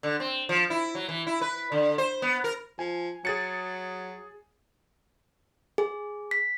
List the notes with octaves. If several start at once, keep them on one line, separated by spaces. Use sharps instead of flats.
D3
C4
F3
E4
F#3
E3
E4
B4
D3
C5
B3
A#4
F3 G#5
F#3 G#4 A6 C#7
G#4
B6